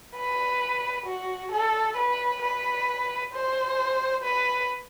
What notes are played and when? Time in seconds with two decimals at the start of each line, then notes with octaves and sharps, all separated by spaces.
0.16 B4
1.06 F#4
1.52 A4
1.97 B4
2.42 B4
3.33 C5
4.24 B4